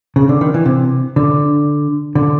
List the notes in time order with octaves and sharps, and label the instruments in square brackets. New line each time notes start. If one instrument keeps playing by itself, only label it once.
[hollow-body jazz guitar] C#3
D3
D#3
E3
C3
D3
D3